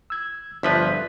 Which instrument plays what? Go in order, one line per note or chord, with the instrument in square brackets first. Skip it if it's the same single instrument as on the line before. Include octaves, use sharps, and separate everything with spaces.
[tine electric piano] E6 G#6
[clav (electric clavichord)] G1 F3 B4 [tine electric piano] D5 E5 B6